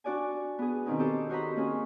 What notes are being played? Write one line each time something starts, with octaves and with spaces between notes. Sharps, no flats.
D4 F#4 D5 G#5
B3 G#4
B2 D#3 C4 C#4 D#4
G4 A4 C5
F#4 C5 D#5 A#5 B5
A#3 C#4 F4 G#4